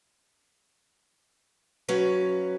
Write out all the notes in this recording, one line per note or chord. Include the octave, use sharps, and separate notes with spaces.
F#3 C#4 B4 F5